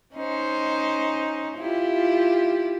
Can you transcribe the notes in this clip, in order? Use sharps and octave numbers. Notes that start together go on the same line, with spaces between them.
C#4 D#4 C5
E4 F4 G4